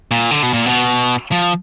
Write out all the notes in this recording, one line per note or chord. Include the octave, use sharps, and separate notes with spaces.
A#2
D3
B2
A#2
B2
F3